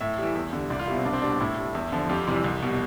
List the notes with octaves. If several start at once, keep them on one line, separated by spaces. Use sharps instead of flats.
A2 E5
E3 G3
E2
D3 G3
C2 D5
F4
B2 G3 E4
C4
C2 D4
C4
B2 G3 D4
A2 E4
G3
E2
D3 F3
F2 G4
C3 E3 G3
C2
B2 G3